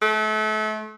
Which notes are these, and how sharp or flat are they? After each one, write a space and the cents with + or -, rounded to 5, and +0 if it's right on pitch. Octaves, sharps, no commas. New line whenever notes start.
A3 -35